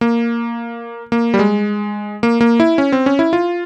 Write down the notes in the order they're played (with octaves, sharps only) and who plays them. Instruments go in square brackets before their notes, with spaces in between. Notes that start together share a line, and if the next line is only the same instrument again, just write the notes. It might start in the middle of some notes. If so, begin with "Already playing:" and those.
[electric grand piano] A#3
A#3
G3
G#3
A#3
A#3
E4
C#4
C4
C#4
E4
F4